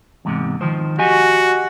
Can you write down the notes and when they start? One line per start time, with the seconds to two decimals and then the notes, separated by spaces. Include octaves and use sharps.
0.25 E2 G#2 C3
0.61 D#3 F3 C5
0.99 F#4 G4 D#5 G#5